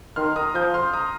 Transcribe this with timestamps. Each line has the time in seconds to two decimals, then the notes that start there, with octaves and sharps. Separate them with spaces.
0.16 D#3 C6 F6
0.36 A#5 D#6
0.54 F3 D#6 G6
0.74 C6 F6
0.93 A#5 D#6